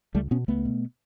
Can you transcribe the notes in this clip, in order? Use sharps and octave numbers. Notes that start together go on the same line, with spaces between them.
C#2 G3 A3
B2 B3 C#4
C#2 A3 B3
B2